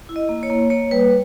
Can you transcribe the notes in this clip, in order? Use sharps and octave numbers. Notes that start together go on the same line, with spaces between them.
E4
D#5
A#3
C#5
A#3
A#3 C#5
G3 B4